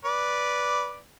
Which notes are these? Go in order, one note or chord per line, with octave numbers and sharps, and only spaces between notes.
B4 D5